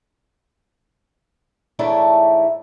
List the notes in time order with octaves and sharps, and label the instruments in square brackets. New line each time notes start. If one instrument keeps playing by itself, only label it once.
[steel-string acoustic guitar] G#2 E3 A3 D4 E4 C#5